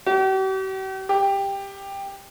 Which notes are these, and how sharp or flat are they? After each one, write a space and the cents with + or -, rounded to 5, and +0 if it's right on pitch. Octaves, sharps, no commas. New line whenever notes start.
G4 -45
G4 +10